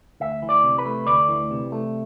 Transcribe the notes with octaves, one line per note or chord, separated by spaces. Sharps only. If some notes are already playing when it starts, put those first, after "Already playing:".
D2 E5
E3
D5
C3
B4
A3
D2 D5
E3
C3
A3